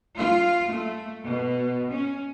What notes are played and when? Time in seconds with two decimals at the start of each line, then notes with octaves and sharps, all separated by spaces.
0.17 F4
0.70 A3
1.25 B2
1.92 C#4